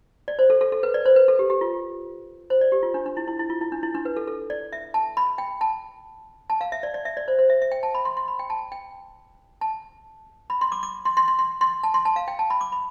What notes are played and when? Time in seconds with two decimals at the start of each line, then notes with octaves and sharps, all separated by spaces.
0.28 D5
0.39 C5
0.50 A4
0.61 A4
0.72 A4
0.83 B4
0.94 D5
1.06 C5
1.16 B4
1.28 A4
1.39 G4
1.50 G4
1.61 F4
2.50 C5
2.61 D5
2.72 G4
2.83 F4
2.94 D4
3.06 D4
3.17 E4
3.28 E4
3.39 E4
3.50 F4
3.61 E4
3.72 D4
3.83 E4
3.95 D4
4.05 B4
4.17 A4
4.27 A4
4.50 D5
4.73 E5
4.94 A5
5.17 B5
5.38 G5
5.61 A5
6.50 A5
6.61 F5
6.72 E5
6.83 D5
6.94 D5
7.05 E5
7.17 D5
7.28 C5
7.39 C5
7.50 E5
7.62 E5
7.72 G5
7.83 A5
7.95 B5
8.05 C6
8.17 C6
8.28 B5
8.39 G5
8.50 A5
8.72 G5
9.61 A5
10.50 B5
10.61 C6
10.72 D6
10.83 D6
11.05 C6
11.17 C6
11.28 C6
11.39 C6
11.61 C6
11.83 A5
11.94 C6
12.05 A5
12.16 F5
12.28 G5
12.39 A5
12.50 B5
12.61 D6
12.72 B5